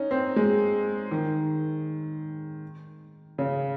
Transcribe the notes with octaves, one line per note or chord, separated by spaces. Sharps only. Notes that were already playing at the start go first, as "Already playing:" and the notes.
Already playing: C#4 D#4
C4
G#3
D#3
C#3